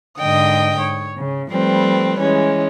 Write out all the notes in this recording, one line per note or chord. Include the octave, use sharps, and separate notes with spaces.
G#2 D3 D#5 G5 D#6
C#5
C#3
F3 G3 A3 C4 B4
E3 G#3 C#4